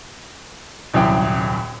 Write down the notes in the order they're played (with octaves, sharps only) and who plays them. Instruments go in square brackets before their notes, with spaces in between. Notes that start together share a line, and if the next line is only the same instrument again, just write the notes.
[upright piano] D#1 C2 F#2 E4 G5